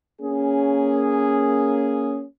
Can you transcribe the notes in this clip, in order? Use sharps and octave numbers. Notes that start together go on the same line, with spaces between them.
A#3 C#4 G#4